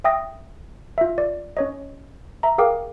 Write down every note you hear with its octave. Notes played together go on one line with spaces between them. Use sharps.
E5 G5 D#6 A#6
F4 E5
D5
C#4 C#5 D#5
E5 A#5
G#4 A#4 F5 G5 D6